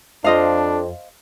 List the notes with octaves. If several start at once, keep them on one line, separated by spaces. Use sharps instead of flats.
F2 D4 C5 D#5 F5